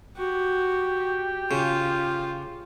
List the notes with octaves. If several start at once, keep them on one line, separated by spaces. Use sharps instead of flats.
F#4 G4
C#3 F4